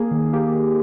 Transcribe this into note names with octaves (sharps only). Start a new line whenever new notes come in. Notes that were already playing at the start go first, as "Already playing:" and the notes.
Already playing: A#3 G#4
D#3
A#3 G4
D#3